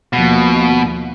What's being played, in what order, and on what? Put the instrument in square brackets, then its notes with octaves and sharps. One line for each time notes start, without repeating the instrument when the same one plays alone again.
[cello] D#2 F3 [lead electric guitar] B2